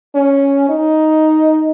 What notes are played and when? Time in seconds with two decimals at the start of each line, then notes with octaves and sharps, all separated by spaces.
0.15 C#4
0.69 D#4